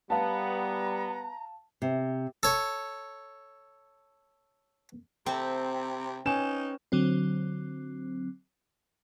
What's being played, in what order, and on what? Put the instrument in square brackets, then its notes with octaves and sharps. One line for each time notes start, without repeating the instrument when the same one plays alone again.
[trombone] G3 [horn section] B3 [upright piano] F5 A5 [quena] A#5
[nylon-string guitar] C3
[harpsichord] A4 C#5
[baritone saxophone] C3 [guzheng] C4 [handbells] C5 E5 A5
[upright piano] C#4 G#5 E7 [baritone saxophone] D#4 [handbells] B4 G5
[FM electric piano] D3 F#3 C4